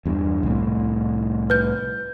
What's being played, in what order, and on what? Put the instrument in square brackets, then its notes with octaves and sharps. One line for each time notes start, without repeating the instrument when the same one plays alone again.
[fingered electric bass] E2 G2
C2 A2
[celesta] B4 G6